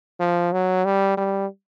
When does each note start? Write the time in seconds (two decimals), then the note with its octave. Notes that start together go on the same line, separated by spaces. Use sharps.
0.20 F3
0.53 F#3
0.85 G3
1.17 G3